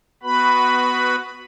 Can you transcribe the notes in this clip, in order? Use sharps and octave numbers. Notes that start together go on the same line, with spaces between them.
B3 F#4 B4 B5